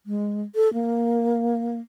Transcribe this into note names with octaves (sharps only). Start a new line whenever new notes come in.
G#3
A4
A#3